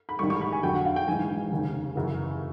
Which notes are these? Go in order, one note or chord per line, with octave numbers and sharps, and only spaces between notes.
B5
A1 G#2 D#3 G3 C#6
C#6
B5
G#5
F2 D3 F#3 G5
F#5
F5
G5
A#1 G#2 E3 G#3 G#5
F1 D#2 C#3
F#2 C#3 E3